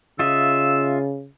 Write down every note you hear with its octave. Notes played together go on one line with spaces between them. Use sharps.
C#3 F4 D#5 E5 E6